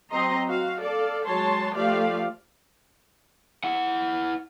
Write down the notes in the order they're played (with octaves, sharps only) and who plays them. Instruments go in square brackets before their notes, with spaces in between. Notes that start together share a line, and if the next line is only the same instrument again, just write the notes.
[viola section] F#3 C4 D#5 A#5 C6
F#4 F5
A4 D5 F5
F#3 G#3 C#5 A5 C6
F3 A3 F4 G4 D5 F5
[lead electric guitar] E4 F#5